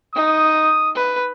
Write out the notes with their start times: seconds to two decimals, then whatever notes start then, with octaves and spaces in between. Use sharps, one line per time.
0.15 D#4 D#6
0.95 B4